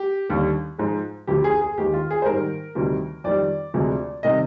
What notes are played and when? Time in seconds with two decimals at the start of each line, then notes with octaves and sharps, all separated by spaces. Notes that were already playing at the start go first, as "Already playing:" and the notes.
Already playing: G4
0.29 D#2 D3 G3
0.78 G#2 F3 G#3
1.27 D2 D3 F3 G4
1.44 G#4
1.61 G#4
1.77 D#2 D#3 G#3 G4
1.94 F4
2.11 G#4
2.22 C5
2.26 G#2 D#3 G3 A#4
2.75 D2 C3 D#3 G3
3.24 F2 D#3 G3 D5
3.74 D2 C3 F3 G#3
4.23 C3 D#3 G3 D#5